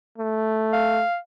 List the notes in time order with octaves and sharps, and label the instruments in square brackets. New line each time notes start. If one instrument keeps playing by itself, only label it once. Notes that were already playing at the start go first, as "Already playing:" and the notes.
[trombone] A3
[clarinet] F5